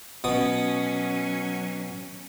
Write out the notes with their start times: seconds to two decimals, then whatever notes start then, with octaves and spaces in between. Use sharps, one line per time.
0.24 B2 F#3 C#4 D#6